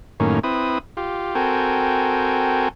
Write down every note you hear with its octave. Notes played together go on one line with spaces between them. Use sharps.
F#2 A2 D#3 A#3 C#4
C4 E4 B4 D#6
F4 G4
C4 F#4 A4 A#4 G5 G#5